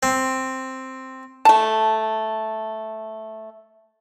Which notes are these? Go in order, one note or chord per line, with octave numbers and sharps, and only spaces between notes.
C4
A3 A5